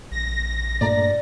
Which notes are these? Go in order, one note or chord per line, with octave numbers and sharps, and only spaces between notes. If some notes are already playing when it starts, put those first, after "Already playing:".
A#1 A#6
G2 A#2 A3 D5 A#5